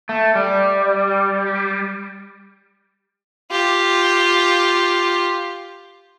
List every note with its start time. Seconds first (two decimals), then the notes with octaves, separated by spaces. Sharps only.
0.09 A3
0.35 G3
3.51 F4 G4